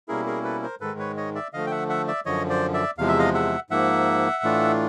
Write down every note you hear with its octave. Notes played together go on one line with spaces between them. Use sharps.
B2 G3 A#3 C#4 E4 G#4 A#4
G#4 A#4
A4 B4
A#4 C5
G#2 D#3 G#3 A4 B4
B4 C#5
C#5 D#5
D5 E5
D3 F3 A3 D#5 F5
G5
E5 F#5
E5 F#5
D5 E5
F#2 D3 F3 C#5 D#5
C5 D5
D5 E5
E2 C3 F3 G#3 F5
E5
D#5 F5
E5 F#5
G#2 F3 A#3 E5 F#5
A2 E3 A3 D4 F4